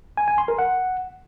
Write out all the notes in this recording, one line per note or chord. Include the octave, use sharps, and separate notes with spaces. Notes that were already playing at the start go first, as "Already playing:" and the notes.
G#5
G#5
C6
A#4
F#5